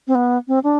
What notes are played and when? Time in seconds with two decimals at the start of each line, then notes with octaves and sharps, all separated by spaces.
0.07 C4
0.15 B3
0.48 C4
0.64 D4